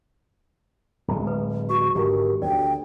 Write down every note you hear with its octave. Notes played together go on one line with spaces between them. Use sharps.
D1 G#3
B4
F#4 C#6
G#1 D3 G4 A#4
D2 D5 G5